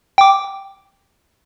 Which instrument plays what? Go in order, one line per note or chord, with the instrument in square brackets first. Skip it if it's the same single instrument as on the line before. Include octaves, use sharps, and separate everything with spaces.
[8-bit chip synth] G5 D6